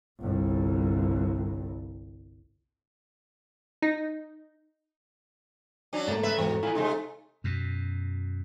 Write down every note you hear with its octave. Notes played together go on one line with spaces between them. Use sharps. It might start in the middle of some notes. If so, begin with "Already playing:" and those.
G1 C2
D#4
F#3 C#4 D4
G#2 A3 A#3 A4 A#5
C#3 B4 E5
E2 G#2 B3 F#4
A2 E4 F4 G#5
C3 G#3 A3 D#4
F#2 B2